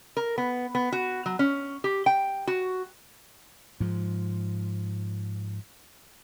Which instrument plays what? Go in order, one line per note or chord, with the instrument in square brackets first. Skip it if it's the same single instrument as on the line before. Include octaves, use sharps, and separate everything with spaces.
[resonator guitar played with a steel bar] A#4
B3
B3
F#4
F#3
C#4
G4
G5
F#4
[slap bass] G#2 F3